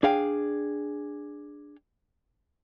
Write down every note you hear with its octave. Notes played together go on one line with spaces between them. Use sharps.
D4 G#4 F5 G5